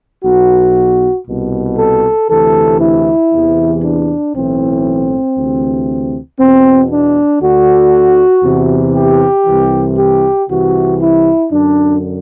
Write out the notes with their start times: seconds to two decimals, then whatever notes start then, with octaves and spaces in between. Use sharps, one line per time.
0.24 B1 B2 F#4
1.27 C2 B2
1.78 A4
2.29 D2 C3 E3 A4
2.80 E4
3.31 E2 C3 E3
3.83 D4
4.34 B1 A2 E3 C4
5.36 D2 C3 E3
6.38 E2 B2 C4
6.90 D4
7.40 D2 D3 F#4
8.44 E2 C3 E3
8.94 G4
9.46 C2 C3 E3
9.96 G4
10.48 C2 C3 E3 F#4
11.00 E4
11.50 F#2 D3 D4